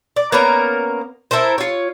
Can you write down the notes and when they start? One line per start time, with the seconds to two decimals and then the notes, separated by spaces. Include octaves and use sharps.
0.16 D5
0.32 A#3 B3 C#4 A#4
1.31 E4 A4 A#4 C5
1.58 F4 C#5